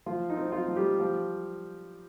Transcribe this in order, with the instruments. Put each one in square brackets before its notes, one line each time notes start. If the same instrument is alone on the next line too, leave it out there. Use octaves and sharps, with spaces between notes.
[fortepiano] F3 F4
D#4
C4
F4
F3
G3 G4
F3